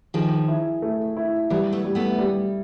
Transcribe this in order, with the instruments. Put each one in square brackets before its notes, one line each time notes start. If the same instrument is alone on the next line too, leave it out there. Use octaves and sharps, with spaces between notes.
[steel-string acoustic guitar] D#3 F3 [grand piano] G#4
[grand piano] E4
A3
E4
[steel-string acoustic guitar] E3 F#3 [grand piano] G3
[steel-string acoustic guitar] A3 B3
[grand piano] G3
[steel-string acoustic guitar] A3 B3
[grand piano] G3